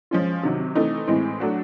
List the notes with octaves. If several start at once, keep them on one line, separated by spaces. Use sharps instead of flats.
F3 G#3 C#4 F4
C3 D#3 F#3
E3 A3 C4 D#4
A2 E3 G#3 C4
F#3 A3 D4 F#4